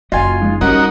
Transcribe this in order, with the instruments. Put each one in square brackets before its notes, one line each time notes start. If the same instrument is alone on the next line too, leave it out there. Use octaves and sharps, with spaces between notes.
[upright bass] F#1 C#3 [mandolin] F4 G#5 [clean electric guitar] F#4 D#5
[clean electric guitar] F3 G#3 D#4
[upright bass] G3 [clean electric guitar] C#4 G4 [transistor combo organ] D#4 F#4 A#4 [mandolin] F#5